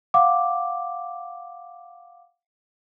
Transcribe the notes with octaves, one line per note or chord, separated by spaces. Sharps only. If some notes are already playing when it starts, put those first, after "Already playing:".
F5 F#5 D6